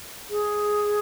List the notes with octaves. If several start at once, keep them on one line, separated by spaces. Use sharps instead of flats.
G#4